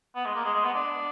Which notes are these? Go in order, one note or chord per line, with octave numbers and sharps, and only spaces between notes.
B3
G#3
A#3
G#3
G#3
B3
D4